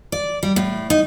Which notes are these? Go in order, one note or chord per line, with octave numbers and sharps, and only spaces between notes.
D5
G3
A2
D#4